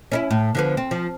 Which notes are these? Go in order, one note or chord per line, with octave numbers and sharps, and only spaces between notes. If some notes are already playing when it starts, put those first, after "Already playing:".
C#4 D#4 E4
A2
D3 F3 B3
C4
F3